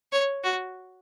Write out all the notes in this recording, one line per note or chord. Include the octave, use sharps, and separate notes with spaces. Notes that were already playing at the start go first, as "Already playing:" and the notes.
C#5
F#4